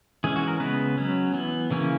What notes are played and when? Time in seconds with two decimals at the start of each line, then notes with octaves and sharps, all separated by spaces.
0.24 E3 G#3 C#4 G#4
0.36 F#4
0.48 A#4
0.60 C#3 G#3 B3 B4
0.98 F#3 C#4
1.34 E3 B3
1.71 C#3 E3 A#3 C#4